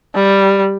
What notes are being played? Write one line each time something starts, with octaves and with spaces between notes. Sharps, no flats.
G3